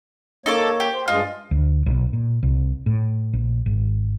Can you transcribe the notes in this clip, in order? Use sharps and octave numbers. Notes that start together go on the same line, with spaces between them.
A#3 D#4 A4 C#5 D6
G4
C5
G2 G#3 F4 D#5
D2
B1
A#2
C2
A2
A#1
G#1